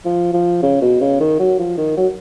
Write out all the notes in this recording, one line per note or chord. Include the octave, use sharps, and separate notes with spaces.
F3
F3
C#3
B2
C#3
D#3
F#3
F3
D#3
F#3